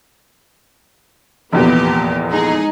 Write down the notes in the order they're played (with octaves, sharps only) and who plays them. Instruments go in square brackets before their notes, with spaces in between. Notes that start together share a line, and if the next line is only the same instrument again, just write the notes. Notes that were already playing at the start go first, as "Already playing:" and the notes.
[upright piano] F1 E2 A#2 [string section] A#3 B3 G4
[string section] G#3 D#4 G#4